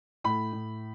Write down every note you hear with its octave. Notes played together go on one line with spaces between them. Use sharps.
A2 B5
A2